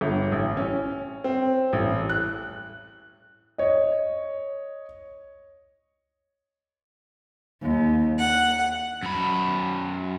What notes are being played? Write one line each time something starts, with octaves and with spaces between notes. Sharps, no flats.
G1
A1
C#4
C4
A1
F#6
C#5 D#5
D#2
F#5
F#2 B5